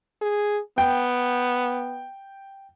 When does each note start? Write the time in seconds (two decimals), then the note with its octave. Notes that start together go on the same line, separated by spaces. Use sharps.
0.21 G#4
0.78 B3 G5